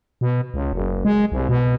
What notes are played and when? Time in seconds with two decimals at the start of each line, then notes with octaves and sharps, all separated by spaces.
0.21 B2
0.54 C#2
0.73 F#1
1.05 G#3
1.32 C2
1.49 B2